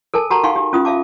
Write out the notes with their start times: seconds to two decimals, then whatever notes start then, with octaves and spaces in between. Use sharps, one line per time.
0.14 A4 A#4 G#5 A5
0.30 F#4 G4 A4 F#5 A5 A#5
0.44 D#4 F5 F#5 G#5 C6 C#6
0.56 G4
0.73 C#4 F4 D#6
0.85 E5 F5 A5 D6